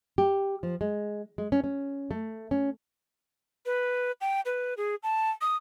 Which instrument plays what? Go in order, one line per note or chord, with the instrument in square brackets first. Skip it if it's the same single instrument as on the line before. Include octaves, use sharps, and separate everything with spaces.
[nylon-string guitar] G4
F3
G#3
G#3
C#4
C#4
A3
C#4
[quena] B4
G5
B4
G#4
A5
D#6